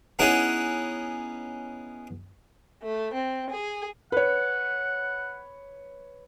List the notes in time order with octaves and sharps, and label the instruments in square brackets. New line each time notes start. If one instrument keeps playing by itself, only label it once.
[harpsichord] B3 C#4 D#4 E4 G#4 F#5
[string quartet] A3
C4
G#4
[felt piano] B4 C#5 [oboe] F#5